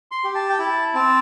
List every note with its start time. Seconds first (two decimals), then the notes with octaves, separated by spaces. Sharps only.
0.11 C6
0.24 G4
0.35 A5
0.50 G5
0.59 E4 A5
0.94 C4 A5